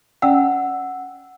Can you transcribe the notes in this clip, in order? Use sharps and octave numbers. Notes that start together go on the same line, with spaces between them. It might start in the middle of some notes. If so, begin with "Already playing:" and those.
C#4 D5 F#5 G5 E6